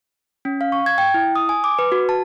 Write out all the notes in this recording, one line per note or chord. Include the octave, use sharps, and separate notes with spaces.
C#4
F5
C#6
G#6
G5
E4
D#6
G#5
D6
B4
F#4
A5